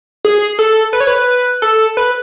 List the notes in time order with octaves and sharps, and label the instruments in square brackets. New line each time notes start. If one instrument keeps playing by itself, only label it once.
[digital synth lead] G#4
A4
B4
C#5
B4
A4
B4